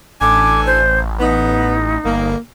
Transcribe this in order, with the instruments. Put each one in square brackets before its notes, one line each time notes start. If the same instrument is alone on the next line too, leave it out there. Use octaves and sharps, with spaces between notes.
[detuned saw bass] A1 [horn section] D4 A4 G#5 [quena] D6
[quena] C5
[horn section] B3 [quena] D#4
[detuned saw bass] G1 [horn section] A#3